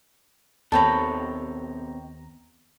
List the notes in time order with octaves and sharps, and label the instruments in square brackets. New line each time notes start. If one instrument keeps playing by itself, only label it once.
[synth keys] D#2 A#5 [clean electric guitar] B2 C4 C#5 [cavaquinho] A4 G5 B5